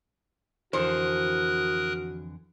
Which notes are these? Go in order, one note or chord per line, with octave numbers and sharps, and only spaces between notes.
F2 D3 E3 F#4 A#4 C5 D#6 F#6